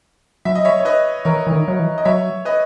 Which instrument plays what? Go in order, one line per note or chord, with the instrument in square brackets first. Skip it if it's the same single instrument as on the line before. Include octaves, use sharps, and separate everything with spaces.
[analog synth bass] F#3 [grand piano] E5
[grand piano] D#5
C#5 E5
C#5
B4 D#5
[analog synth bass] E3 [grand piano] A#4 C#5
[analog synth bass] E3
D#3
F#3
E3
[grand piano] D#5
[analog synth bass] F#3 [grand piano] C#5 E5
[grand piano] B4 D#5